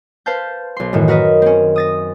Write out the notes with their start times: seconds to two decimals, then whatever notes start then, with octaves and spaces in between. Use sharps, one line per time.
0.26 B4 C5 F5 A5 G6
0.76 B1 C6
0.93 F#2 A2 D#3 E3
1.08 F#4 A#4 B4 D#5
1.42 C4 C#4
1.76 D#6 A6 A#6